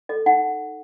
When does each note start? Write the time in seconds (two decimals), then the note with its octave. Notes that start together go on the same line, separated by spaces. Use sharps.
0.09 A4 D#5
0.26 D#4 F#5